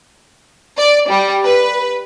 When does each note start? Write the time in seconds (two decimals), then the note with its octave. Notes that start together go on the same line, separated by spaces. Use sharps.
0.78 D5
1.09 G3
1.44 B4